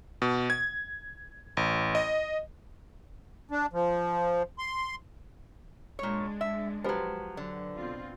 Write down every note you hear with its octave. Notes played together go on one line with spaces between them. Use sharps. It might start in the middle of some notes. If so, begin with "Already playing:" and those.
B2
G#6
A1
D#5
D4
F3
C6
A#2 G#3 D4 C#5
E5
F3 F#3 G4 B4 C5
D3 F#3
B2 C4 F4